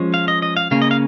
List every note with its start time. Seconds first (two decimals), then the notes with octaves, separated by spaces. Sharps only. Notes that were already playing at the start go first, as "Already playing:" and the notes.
Already playing: F3 G#3 C#4
0.14 F5
0.28 D#5
0.42 D#5
0.57 F5
0.71 C#3 A#3 C#4 F5
0.82 D#5
0.91 F5